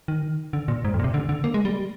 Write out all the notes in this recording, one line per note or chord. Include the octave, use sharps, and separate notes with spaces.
D#3
D3
A#2
G#2
F2
A#2
C3
D3
D3
A#3
G#3
G3